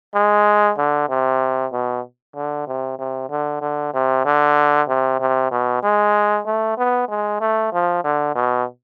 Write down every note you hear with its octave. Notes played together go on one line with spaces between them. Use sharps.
G#3
D3
C3
B2
D3
C3
C3
D3
D3
C3
D3
C3
C3
B2
G#3
A3
B3
G#3
A3
F3
D3
B2